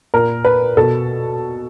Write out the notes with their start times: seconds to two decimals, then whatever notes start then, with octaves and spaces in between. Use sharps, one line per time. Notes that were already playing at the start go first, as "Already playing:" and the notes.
0.14 A#2 A#4
0.45 B4
0.77 B2 A4